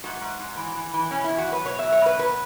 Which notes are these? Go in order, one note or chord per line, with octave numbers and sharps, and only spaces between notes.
G#2 F#4
G#2
G#2
E3
E3
E3
B2 C#4
E4
E2
F#4
F#3 B4
B2 C#5
F#3 E5
C#5
B2 B4
F#3 B4